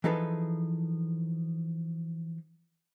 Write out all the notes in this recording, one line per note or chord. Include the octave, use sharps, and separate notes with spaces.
E3 F3 D#4 G#4 A4 B4